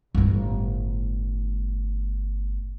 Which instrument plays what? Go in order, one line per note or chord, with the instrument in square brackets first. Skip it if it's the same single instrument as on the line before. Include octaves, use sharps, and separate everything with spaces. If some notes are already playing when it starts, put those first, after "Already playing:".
[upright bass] G1 A2